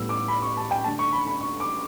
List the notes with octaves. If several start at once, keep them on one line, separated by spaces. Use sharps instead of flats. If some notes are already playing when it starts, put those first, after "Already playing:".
Already playing: A2 G3 B3 E6
D6
B5
C#6
A5
G5
D3 A3 A5
C#6
B5
B5
C#6
D6